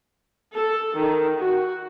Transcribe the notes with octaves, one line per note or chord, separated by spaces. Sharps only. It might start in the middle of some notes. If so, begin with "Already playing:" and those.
A4
D#3
F#4